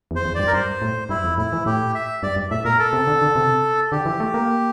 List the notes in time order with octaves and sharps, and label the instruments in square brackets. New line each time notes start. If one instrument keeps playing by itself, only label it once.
[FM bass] E2
[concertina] C5
[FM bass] E2
[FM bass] G2 [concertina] D5
[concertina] A#4
[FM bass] G2 [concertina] C5
[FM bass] A2
[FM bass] G2 [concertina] E4
[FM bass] F2
[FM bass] A2 [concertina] E4
[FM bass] E3
[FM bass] A2 [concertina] G4
[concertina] E5
[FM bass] G2 [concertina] D5
[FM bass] G2
[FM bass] A2 [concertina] E5
[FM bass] A#2 [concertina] A#4
[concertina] A4
[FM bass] C3
D3
D3
C3
[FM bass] D3 [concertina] G4
[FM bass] E3
A3
A#3